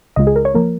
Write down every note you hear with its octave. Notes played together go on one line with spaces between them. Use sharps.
C#2 C#3 G#3 F4 D#5
G#4
A#4
C#5
F3 A#3 A#4